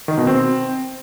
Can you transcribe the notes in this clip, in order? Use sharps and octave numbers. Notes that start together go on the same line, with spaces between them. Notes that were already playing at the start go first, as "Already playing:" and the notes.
D#3
B2
C4